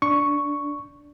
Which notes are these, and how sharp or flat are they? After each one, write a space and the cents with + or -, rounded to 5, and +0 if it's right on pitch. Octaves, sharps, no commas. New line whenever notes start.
D4 -10 C#6 +0